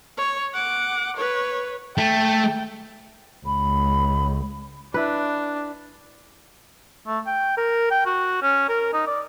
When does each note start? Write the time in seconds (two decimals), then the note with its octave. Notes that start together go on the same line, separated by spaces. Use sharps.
0.18 C#5
0.54 F#5 D6
1.16 B4 C#5
1.98 A3 G5
3.46 C#2 B5
4.94 D4 E4 B4
7.07 A3
7.26 G5
7.57 A#4
7.91 G5
8.06 F#4
8.42 C#4
8.69 A#4
8.93 D#4
9.07 D5